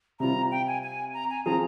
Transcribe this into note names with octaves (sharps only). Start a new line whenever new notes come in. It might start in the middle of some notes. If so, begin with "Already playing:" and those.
C3 G3 C4 F4 A#5
G5
G#5
G#5
A#5
G#5
F3 C4 F4 G#4 A#5